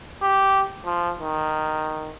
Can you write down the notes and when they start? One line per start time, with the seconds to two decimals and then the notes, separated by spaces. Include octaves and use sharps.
0.22 G4
0.85 F3
1.20 D#3